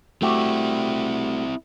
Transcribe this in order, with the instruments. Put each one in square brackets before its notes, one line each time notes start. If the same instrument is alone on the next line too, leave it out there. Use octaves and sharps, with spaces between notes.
[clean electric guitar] A3 F#4 G4 [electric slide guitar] C4 E4